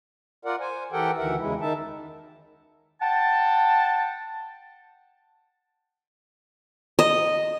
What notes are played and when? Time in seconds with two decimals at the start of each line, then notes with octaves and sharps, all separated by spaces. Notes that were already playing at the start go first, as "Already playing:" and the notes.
0.45 F4 A#4 D5 F#5
0.60 C5 G#5
0.92 E3 G4 A4 A#4 F#5 G5
1.18 D2 D#3 E3 A#4 E5 F#5
1.39 E2 C#3 G#3 E4
1.61 D#3 D#4 E5 A5
3.01 F#5 G5 A5
6.99 D#5